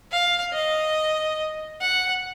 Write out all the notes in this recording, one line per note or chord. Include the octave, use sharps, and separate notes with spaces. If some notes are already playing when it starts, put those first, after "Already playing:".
F5
D#5
F#5